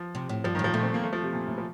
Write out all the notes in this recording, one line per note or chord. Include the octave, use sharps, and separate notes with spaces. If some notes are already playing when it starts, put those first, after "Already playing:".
Already playing: F3
C3
A2
G2 F3
A2 D#3
F3
A#2 A3
C4
A#3
A3
F3
C3
A#2
A2
F3